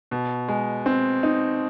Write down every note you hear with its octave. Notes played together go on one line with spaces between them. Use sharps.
B2
G#3
C4
D#4